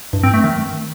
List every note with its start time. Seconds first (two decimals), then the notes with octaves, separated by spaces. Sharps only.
0.13 G2
0.23 C4
0.34 A3
0.44 D#3